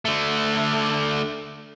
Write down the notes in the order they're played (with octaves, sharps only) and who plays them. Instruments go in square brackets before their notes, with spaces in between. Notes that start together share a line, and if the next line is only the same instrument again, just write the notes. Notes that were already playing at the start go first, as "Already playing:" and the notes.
[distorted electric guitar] D3 A3